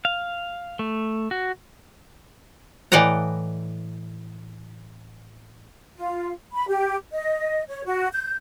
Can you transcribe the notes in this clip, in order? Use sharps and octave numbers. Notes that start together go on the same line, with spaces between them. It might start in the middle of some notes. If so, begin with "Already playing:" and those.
F5
A3
F#4
A2 E3 D5 D#5 F#5 A#5
F4
B5
G4
D#5
C#5
F#4
G6